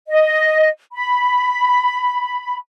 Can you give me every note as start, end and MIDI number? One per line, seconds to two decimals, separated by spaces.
0.08 0.68 75
0.92 2.57 83